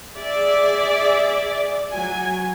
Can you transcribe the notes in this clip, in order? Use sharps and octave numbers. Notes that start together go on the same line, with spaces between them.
G#4 D5 E5
F#3 G#5